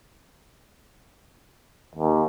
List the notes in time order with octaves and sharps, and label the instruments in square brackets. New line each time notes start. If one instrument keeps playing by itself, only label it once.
[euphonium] D#2